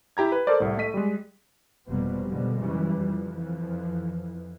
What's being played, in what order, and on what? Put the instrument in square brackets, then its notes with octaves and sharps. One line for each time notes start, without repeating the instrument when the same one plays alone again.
[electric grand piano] E4 G4 A#5 G#6
B4
A4 A#4 C5 D5
C2 A2
A3 D#5 B6 D#7
G3 G#3
[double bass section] F1 B2 F3 G3 A#3 C4
F2 B2 D3 F3 G3 G#3
F#2 C#3 E3 F3 G3
F2 E3 F3